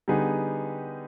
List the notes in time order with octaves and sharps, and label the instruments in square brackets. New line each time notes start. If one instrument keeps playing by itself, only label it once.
[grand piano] D3 G3 B3 D#4 G#4